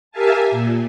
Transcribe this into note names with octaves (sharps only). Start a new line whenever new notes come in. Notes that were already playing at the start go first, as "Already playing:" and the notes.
G4 A#4 E5 F5 G#5 A5
A#2